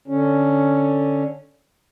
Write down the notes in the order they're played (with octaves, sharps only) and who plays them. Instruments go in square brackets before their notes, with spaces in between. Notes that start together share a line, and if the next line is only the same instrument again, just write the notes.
[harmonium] D3 C#4